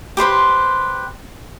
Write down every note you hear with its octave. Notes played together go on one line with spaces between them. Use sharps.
G4 B4 C5 C6